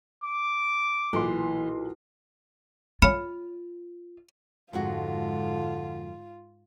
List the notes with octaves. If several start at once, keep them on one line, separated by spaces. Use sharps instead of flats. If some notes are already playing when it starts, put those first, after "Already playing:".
D6
B1 A#2 E3 C6
A3 C#4 F4 F5 B5 F6 C#7
F2 G#2 D3 G#3 F4 F#4